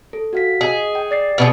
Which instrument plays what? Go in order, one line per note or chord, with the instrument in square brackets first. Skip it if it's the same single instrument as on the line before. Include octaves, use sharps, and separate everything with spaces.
[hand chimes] A4
F#4 F5 B6
[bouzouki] G#4 [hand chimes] D#5
[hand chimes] G5
D5 A6 C7
[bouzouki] B2 B3 G#4